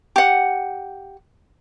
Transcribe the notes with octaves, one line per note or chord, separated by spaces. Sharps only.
G4 F#5